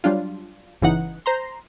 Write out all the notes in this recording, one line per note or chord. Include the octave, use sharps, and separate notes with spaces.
F#3 G3 D4 F4
G1 C#3 E3 D#4 F#5
C5 A#5 C6